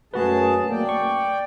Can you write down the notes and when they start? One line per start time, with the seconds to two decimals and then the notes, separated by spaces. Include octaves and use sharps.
0.14 F#2 A3 F#4 G#4 B4 A5
0.71 A#3 D5 G5
0.89 C#6